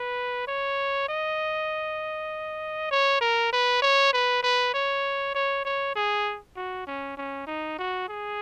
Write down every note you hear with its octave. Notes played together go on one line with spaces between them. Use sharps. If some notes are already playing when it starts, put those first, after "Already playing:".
Already playing: B4
C#5
D#5
C#5
A#4
B4
C#5
B4
B4
C#5
C#5
C#5
G#4
F#4
C#4
C#4
D#4
F#4
G#4